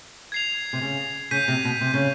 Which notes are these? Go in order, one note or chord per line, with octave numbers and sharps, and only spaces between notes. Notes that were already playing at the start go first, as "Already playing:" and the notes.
G#6 C7 F7
C3
C#3
C#3 G6 B6 D#7
C3
B2
C3
C#3